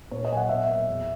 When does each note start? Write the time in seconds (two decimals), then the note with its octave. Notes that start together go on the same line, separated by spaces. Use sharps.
0.11 A#2 C#5
0.25 D#5
0.31 F#3 A#3 G#5
0.37 F#5
0.49 B2 E5
0.68 A#3
0.87 E2